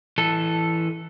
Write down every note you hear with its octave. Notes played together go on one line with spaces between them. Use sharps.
E3 A4